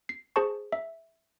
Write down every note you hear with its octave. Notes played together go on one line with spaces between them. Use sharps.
C7
G#4 C5 A5 C#6
E5